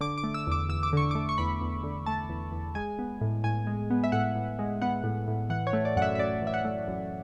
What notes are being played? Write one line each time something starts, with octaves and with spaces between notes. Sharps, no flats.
D3 D6
D6
A3
E6
E2 D6
E2 E6
D6
D3 C#6
A3 D6
C#6
E2 B5
E2
D3
A3 A5
E2
E2
G#3 G#5
B3
A2
A2 G#5
G#3
B3
E5
A2 F#5
A2
G#3
B3 F#5
A2
A2
E3 F#5
C#5
A3
D5
F#2 F#5
E5
E5
F#2 D5
E3 E5
F#5
A3
F#2